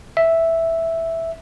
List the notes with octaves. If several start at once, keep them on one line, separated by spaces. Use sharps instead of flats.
E5